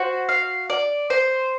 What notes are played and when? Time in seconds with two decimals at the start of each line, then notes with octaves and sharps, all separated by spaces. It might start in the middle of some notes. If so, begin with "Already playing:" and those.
Already playing: F#4 C5
0.29 F5
0.70 D5
1.10 C5